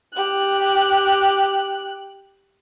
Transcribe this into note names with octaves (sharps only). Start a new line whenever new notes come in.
G4 F#6